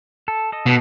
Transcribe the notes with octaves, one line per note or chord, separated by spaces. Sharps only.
A4
A4 D#5
B2